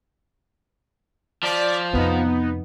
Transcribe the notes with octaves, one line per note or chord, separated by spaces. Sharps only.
F3 D5 B6
F2 C3 B3 D#4